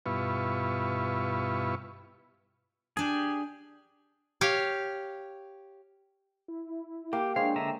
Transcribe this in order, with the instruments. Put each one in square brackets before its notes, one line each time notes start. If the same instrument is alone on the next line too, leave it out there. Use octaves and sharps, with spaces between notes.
[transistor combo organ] G2 B2 E4 F4 B4 C#6
[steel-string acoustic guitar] D4 G#5 [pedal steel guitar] G4 G#4
[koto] G4 C#5 F5
[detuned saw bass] E4
[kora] A#3 [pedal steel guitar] G4 [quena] G5
[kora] G#3 C5 C#5 [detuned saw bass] D4 [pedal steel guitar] F5
[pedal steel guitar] D3 E5 A#5